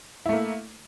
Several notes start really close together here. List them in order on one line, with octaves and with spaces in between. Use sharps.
E4 A3 A#3